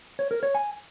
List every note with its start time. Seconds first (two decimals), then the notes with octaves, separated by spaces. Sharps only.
0.19 C#5
0.31 A#4
0.43 C#5
0.55 G#5